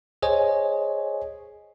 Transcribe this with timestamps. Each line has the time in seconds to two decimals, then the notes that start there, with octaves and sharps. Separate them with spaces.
0.22 G#4 C5 C#5 D#5 G#5